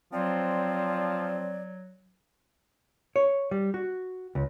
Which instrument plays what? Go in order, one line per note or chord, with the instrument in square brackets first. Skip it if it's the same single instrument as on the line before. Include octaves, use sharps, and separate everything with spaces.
[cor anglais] F3 [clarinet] F#3 [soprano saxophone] C4 [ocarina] D5
[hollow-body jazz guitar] C#5
G3
F#4
C#2